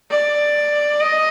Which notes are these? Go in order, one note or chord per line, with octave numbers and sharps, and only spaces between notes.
D5
D#5